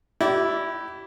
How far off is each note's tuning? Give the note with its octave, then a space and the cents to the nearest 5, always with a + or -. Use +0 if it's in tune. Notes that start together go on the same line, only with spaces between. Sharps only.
E4 +0 G4 -35 D5 -10